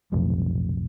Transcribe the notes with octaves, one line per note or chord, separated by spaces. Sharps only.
F1 B1 F2 A2